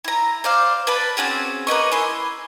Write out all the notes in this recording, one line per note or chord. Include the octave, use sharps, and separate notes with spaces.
E4 A#5
C5 D5 F5
B4 D5 A5 B5
C4 C#4 F#4 G#4
A#3 B4 D#5 C#6
E4 G#5 C6